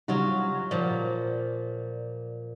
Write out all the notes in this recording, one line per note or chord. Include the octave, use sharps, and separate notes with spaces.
C#3 F#3 G3 D#4 F4 F#4
A#2 F3 D5